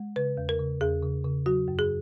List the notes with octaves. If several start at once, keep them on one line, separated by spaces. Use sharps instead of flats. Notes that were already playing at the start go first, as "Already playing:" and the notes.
Already playing: G#3
C#3 B4
E2
A#4
C#3
E2 G#4
C#3
C#3
F#3 F#4
F#2
G#4